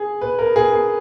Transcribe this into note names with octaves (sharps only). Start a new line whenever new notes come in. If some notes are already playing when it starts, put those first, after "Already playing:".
Already playing: G#4
B4
A#4
G#4
G#4